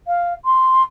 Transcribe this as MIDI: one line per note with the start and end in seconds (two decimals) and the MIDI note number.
0.07 0.33 77
0.45 0.82 84